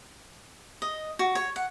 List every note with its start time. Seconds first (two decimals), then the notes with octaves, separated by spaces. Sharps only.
0.82 D#5
1.19 F#4
1.35 C#5
1.56 F#5